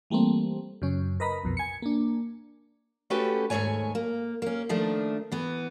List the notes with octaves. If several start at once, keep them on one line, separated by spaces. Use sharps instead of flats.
E3 G3 A3 A#3 C4
F#2 C#3 C#4
A#4 B4 D#5 A#5 B5
B1 F2 B2
G#5 C#7
A#3 D4
A3 C#4 F#4 G4 A4 B4
D#2 G#2 C3 A3 C#5 G#5
A#3
A#3 C#4
D#3 F3 A3 D4
E3 B3